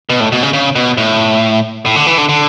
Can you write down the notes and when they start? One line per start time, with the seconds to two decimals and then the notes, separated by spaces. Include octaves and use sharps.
0.09 B2
0.20 A2
0.32 B2
0.43 C#3
0.53 C#3
0.75 B2
0.97 A2
1.86 A2
1.96 D3
2.07 E3
2.18 D3
2.29 D3